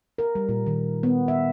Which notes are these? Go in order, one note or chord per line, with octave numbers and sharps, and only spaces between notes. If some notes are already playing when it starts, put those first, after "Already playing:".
A#4
G3
A#2
D#3
B3
E5